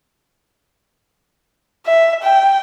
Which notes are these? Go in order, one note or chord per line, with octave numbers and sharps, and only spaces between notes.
E5
G5